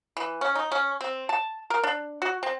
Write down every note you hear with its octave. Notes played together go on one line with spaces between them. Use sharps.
E3
C#4
D#4
C#4
C4
A5
A#4
D4
F#4
C4